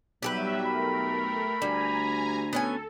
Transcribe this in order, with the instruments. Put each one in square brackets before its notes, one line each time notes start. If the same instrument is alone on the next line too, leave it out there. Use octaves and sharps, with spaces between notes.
[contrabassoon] B1 [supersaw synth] F#3 G3 E5 [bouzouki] G4 G#4 B4
[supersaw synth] A3 A#4 [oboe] B5
[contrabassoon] D2 [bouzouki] G3 [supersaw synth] G#5 A#5
[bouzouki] B3 C#4 G#5 [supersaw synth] A4